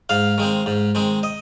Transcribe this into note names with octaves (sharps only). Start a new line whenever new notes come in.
G#2 F5
D#3 G#3 C4
G#2
D#3 G#3 C4
D#5